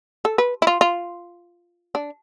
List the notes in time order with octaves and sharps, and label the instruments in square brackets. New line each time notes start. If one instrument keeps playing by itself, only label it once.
[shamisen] A4
B4
E4
F4
F4
D4